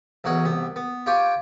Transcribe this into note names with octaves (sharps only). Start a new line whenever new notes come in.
B1 E2 F#4 C#5 F#5 D#6
C2 B3
B3
F4 G4 C#5 G5 G#5